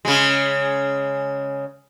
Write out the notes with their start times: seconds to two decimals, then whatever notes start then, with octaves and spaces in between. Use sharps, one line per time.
0.05 C#3 G#3